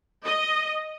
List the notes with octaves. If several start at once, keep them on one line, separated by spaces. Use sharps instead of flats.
D#5